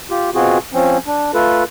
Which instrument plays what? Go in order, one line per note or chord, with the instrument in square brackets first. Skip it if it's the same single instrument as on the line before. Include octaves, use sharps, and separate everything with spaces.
[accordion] F4 G4
B2 C4 F4 F#4 G#4
F3 C4 C#4
D4
A3 F4 A4 B4